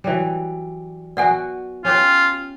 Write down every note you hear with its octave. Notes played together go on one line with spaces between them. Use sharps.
E3 F#3 G3
B3 F#4 D5 F#5 G#5
C#4 F4 G4 B4